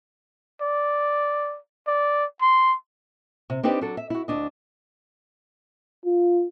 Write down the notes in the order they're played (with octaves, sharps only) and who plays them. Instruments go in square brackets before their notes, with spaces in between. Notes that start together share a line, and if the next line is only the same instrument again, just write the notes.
[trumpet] D5
D5
C6
[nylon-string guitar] C3
C4 D4 D#4 G4 B4 D5
F#3 D4 A4
E5
E4 F#4
D2 D4 D#5
[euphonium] F4